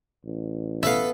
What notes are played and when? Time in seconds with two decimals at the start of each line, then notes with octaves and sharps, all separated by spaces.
0.25 A1
0.83 B3 A4 B4 E5 F5 A5